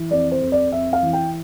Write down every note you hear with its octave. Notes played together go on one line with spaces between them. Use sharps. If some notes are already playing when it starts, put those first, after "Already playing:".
Already playing: E3
F2 D5
C5
F2
D5
F2 E5
F5
E3
G5